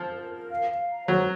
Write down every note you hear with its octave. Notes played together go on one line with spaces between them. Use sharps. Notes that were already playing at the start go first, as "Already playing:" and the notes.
Already playing: F3
A#4
A#4
F5
F5
A#5
F#3 C5